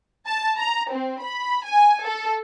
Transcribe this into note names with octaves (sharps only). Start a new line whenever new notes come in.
A5
A#5
C4
B5
G#5
A4